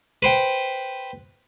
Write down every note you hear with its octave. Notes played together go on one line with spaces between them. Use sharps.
B4 C5 G5